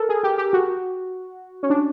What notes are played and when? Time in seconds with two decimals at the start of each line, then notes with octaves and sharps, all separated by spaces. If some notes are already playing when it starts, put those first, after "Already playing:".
Already playing: A4 A#4
0.09 G#4
0.23 G4
0.38 G4
0.53 F#4
1.63 C#4
1.70 D4